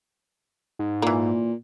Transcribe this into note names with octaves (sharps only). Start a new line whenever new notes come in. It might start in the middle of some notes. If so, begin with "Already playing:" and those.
G#2
A#2 E3 A#3